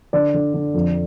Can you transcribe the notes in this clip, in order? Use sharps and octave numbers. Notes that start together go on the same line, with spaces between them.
D3 D5
D3
D3
F2